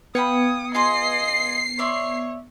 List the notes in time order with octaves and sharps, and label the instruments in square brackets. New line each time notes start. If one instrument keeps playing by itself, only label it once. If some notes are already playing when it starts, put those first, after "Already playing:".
[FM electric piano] B3 G#6 C#7 [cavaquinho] F5 G5 B5 [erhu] D#6
[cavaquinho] F4 G#4 C6 [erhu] D#5 [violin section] C7
[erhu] C#5 [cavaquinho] D5 E5 C6